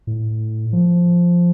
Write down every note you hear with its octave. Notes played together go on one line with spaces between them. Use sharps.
A2
F3